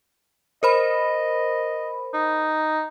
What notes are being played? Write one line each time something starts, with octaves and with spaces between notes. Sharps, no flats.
A#4 C5 D#5 B5
D#4